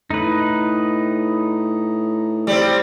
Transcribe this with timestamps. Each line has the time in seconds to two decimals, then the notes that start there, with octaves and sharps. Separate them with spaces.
0.10 A2 D#4 B4
2.47 G3 C4